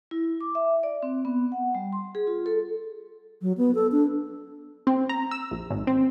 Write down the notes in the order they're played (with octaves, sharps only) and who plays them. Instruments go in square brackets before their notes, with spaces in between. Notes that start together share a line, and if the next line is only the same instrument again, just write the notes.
[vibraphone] E4
D6
E5
D5
C4
B3
F#5
G3
C6
G#4
F4
A4
[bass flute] F#3
B3
A4
D4
[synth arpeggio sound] C4
A#5
E6
A#1
G#1
C4